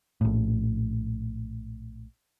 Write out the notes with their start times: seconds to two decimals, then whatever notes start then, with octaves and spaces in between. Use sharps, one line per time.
0.21 A#1 A2